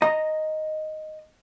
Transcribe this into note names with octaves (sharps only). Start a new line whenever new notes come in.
D#5 A#5